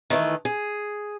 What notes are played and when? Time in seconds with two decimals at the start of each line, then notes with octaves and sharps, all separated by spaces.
0.10 D#3 E3 G3 A3
0.45 G#4